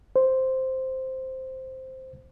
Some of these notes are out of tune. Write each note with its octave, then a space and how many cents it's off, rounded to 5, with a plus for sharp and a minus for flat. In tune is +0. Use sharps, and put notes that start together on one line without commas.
C5 +0